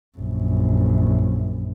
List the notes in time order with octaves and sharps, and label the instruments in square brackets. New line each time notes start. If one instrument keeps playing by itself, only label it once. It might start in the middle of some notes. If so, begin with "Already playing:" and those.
[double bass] A#1 F#2